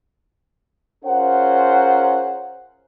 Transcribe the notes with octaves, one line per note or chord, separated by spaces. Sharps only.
C#4 F4 G#4 A#4 C5 F#5